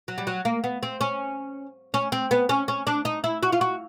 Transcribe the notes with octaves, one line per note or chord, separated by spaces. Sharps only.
F#3
G3
F#3
A#3
B3
C4
C#4
C#4
C4
B3
C#4
C#4
D4
D#4
E4
F#4
F4
F#4